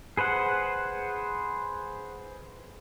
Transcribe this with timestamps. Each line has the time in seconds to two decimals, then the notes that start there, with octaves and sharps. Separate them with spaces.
0.17 G#4 B4 C5 F#5